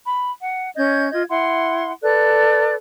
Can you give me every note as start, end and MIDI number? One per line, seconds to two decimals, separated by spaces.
0.05 0.29 83
0.39 0.69 78
0.76 1.11 61
0.76 1.11 75
0.76 1.11 91
0.76 1.11 92
1.11 1.23 65
1.11 1.23 75
1.11 1.23 92
1.29 1.92 64
1.29 1.92 78
1.29 1.92 84
2.02 2.75 69
2.02 2.75 71
2.02 2.75 74
2.02 2.75 90